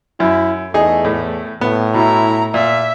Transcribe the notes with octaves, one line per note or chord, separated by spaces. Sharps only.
F#2 E4
E2 A3 D#4 G#4 D#5
A2
A2 B3
B2 E4 A#5
A#2 E5